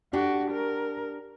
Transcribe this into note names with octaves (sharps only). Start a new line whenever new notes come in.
D4 F#4 G4
A#4